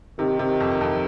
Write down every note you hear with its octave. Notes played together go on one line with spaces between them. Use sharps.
C3 D#3
C3
F2
F2